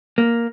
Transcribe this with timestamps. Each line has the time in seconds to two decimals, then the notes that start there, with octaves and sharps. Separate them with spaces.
0.18 A#3